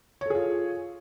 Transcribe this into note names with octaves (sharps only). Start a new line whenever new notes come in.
F4 G#4 A4 C#5